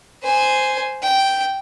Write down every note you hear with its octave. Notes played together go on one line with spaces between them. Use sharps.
C5 G#5
G5